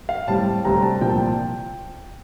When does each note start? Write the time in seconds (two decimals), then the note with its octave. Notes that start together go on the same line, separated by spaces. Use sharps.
0.09 F5
0.27 A2 G3 C4 A5
0.65 D2 C3 G3 C4 A#5
0.82 A5
1.01 C2 A#2 F3 C4 G5
1.10 A5
1.18 G5